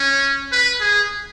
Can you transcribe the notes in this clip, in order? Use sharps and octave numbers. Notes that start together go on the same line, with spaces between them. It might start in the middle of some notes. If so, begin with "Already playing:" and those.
Already playing: C#4
B4
G#4